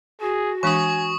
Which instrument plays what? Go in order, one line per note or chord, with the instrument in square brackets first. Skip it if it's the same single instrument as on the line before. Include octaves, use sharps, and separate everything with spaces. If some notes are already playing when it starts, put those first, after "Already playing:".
[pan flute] F#4 [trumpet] G#4
[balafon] E3 G#3 D4 [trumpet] G#5 [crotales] C#6 D#6